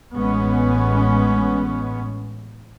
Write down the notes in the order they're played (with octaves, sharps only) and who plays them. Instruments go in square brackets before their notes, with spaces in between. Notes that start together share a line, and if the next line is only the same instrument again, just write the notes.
[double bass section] A1 G#3 B3 C#4